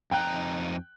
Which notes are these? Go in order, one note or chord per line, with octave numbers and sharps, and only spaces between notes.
F2 D#4 G5 A#5 F#6